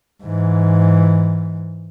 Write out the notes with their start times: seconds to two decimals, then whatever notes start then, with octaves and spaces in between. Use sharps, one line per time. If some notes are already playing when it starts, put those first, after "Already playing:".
0.24 G#2 E3